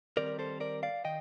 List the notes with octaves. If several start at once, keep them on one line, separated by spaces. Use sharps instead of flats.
D#3 G3 C4 A#4 D5
A4 C5
A#4 D5
D5 F5
D#3 D#5 G5